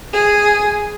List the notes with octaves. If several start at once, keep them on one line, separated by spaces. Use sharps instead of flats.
G#4